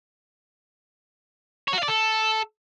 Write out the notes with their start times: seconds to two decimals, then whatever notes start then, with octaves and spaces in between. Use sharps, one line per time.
1.68 C#5
1.73 F#4
1.78 F5
1.83 D5
1.88 A4